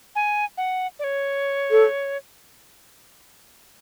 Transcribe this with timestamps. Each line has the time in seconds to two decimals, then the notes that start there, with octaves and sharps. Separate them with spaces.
0.15 G#5
0.58 F#5
0.99 D5
1.04 C#5
1.71 A4